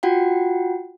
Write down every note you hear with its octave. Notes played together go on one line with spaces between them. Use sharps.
F4 F#4 F#5 G5